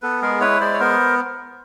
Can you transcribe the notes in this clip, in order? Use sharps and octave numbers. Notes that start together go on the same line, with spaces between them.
B3 A4 B4
G#3 G#4 A#4
E4 B4 C#5
G#3 C5 D5
C#5
B3 A#4 C5